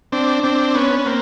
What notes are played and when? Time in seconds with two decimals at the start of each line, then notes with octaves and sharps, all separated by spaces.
0.12 C4 D4
0.43 C4 D4
0.75 B3 C#4
0.99 C#4
1.06 A#3 C4